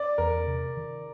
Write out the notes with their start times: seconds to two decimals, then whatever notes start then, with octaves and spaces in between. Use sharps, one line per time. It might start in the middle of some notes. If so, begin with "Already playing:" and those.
Already playing: D5
0.18 E2 A#4
0.47 C3
0.77 D#3